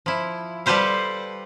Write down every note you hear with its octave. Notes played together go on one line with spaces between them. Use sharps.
F3 E4
G3 G4 A4 B4 C5 F5